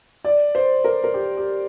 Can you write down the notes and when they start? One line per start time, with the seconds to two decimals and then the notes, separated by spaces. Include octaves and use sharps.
0.24 D5
0.55 C5
0.84 A#4
1.04 A#4
1.14 G4
1.37 G4